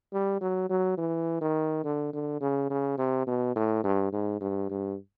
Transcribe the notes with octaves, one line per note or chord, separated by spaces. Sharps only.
G3
F#3
F#3
E3
D#3
D3
D3
C#3
C#3
C3
B2
A2
G2
G#2
G2
G2